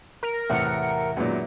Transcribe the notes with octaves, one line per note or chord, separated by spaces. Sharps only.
A#4
E2 A2 C3 E3 E5 F#5 C#7
F#2 A#2 D#3 G#3 B3